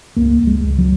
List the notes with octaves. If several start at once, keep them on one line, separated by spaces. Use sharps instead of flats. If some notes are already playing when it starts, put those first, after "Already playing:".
C#2 A#3
C#2
G#3
C#2
F#3